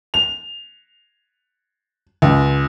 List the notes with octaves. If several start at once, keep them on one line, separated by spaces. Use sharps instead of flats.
F7
C#2